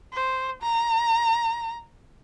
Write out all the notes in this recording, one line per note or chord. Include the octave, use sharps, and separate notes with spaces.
C5
A#5